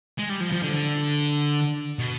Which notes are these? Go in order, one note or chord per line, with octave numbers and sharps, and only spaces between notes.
G#3
G3
F3
F3
D3
B2